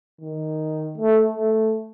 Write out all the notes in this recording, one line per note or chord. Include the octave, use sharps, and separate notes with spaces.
D#3
A3
A3